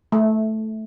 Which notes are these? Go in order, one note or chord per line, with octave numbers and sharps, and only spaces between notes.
A3